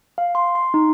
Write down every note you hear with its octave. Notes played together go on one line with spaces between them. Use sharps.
F5
C6
C6
D#4